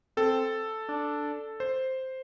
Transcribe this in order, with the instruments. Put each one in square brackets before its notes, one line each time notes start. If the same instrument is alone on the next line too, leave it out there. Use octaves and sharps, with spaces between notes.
[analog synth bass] C4 [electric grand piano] A4
[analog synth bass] D4
[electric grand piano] C5